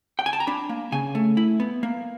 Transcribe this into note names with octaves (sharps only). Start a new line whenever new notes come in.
G5
G#5
A5
A#5
D4 B5
A#3
C#3 G#5
A3
E4
B3
A#3